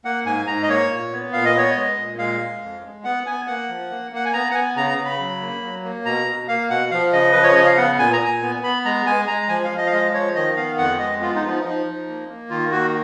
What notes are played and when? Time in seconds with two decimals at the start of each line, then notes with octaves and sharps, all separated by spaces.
0.05 A#3 F#5
0.25 G#2 G#5
0.47 G#2 A#5
0.63 D#5
0.68 A#3 C#5
0.90 A#2
1.12 B3
1.32 A#2 F5
1.45 D#5
1.55 B3 C#5
1.70 D#5
1.76 G#3
1.97 A#2
2.18 G#3 F5
2.41 G#3
2.62 F2
2.84 G#3
3.04 B3 F#5
3.26 B3 G#5
3.47 A#3 F#5
3.69 F3
3.91 A#3
4.12 A#3 F#5
4.25 G#5
4.33 B3 A#5
4.50 F#5
4.55 B3 G#5
4.76 C#3 A#5
4.90 A#5
4.98 C#3
5.05 B5
5.20 F#3
5.41 A#3
5.62 F#3
5.84 A#3
6.05 B2 A#5
6.27 B2
6.48 A#3 F5
6.70 B2 F#5
6.91 F3 F5
7.13 C#3 D#5
7.32 F3 B4
7.43 C#5
7.55 C#3 D#5
7.66 F5
7.77 B3 F#5
7.99 A#2 G#5
8.13 A#5
8.21 A#2 G#5
8.42 B3
8.63 B3 B5
8.85 G#3 A#5
9.06 G#3 G#5
9.27 G#3 A#5
9.49 F3 G#5
9.64 F5
9.70 F3
9.78 D#5
9.87 F5
9.92 G#3 D#5
10.14 F3 C#5
10.35 D#3 D#5
10.56 B3 F5
10.78 F2 F#5
10.99 G#3 D#5
11.21 B3 F4
11.35 D#4
11.42 F3 F4
11.50 D#4
11.65 F3 D#4
11.86 F3
12.08 A#3
12.29 A#3
12.50 D#3 F4
12.71 A#3 F#4